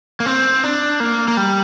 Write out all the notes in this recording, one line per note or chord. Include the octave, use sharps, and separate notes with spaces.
A#3
C4
D4
A#3
A#3
G3